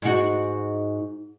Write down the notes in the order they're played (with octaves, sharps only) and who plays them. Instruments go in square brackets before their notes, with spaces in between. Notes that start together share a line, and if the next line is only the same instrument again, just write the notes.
[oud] G#2 F#4